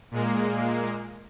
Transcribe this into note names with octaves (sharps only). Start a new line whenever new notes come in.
A#2 G#3 A#3